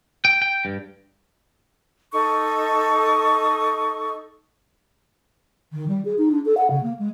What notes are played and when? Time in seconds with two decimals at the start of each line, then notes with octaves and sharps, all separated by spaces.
0.25 G5
0.42 G5
0.65 G2
2.13 D#4 A4 C#6 D#6
5.72 D#3
5.88 G3
6.05 G#4
6.18 D#4
6.31 D4
6.45 A4
6.57 F#5
6.70 C#3
6.83 A#3
6.99 G#3